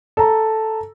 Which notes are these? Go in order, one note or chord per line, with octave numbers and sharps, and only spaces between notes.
A4 A#5